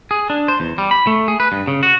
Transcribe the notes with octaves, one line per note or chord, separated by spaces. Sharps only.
G#4
D4
C5
E2
G3
B5
A3
G#4
B4
G2
C#3
F#4